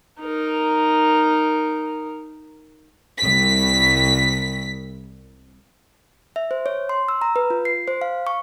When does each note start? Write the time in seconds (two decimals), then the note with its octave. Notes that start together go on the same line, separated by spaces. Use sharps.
0.21 D#4 A#4
3.18 C2 B6
6.36 E5
6.51 C5
6.66 C#5
6.89 C6
7.08 E6
7.22 A#5
7.36 B4
7.50 F4
7.65 C7
7.88 C5
8.01 F5
8.27 C#6